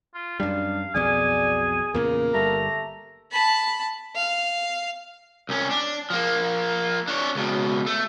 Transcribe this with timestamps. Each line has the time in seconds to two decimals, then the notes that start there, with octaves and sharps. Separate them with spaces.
0.14 F4
0.40 F#2 G3 D4 F5
0.95 B1 F2 B2 G#4 D5 G#5
1.94 E2 A#2 C#3 A#3
2.34 G1 G3 A3 A#5
3.32 A5 B5
4.15 F5
5.49 C2 C#4
5.71 D4
6.10 F3 A#3
7.08 D4 C#5
7.35 C#2 B2
7.86 A3